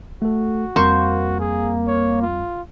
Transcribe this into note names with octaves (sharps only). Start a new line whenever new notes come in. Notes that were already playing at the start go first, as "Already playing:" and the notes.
A3 F#4 A4
F2 G3 A#3 C4 C5 C#6
G#4
C#5
F4